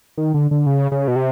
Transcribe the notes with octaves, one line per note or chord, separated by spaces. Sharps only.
D#3
D3
D3
C#3
C#3
B2
C3